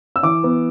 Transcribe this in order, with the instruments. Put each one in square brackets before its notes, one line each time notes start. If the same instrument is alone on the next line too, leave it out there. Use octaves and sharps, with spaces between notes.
[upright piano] E6
E3 D6
B3